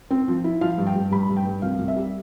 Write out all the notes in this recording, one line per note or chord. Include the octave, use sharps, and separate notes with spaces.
C4
F3
E4
F3 F5
G2
G5
G2
G2 B5
G2
G5
G2
C2 F5
C2
E5
G3